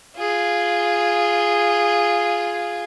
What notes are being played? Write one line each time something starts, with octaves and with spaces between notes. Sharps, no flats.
F4 G#4